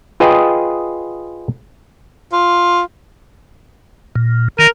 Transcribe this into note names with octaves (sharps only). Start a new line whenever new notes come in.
F4 G#4 B4 D#5 G5
F4
A#2
D#3 A#4